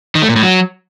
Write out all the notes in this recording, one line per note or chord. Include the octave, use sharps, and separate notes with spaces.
D#3
A3
A#2
A2
F#3